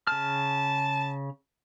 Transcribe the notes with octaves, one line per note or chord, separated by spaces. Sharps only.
C#3 A5 F6